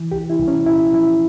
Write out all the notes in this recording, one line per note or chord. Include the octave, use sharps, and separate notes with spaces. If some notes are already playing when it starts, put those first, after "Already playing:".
Already playing: E3
C2 G4
E4
C2
C#4
A#2 E4
F3 E4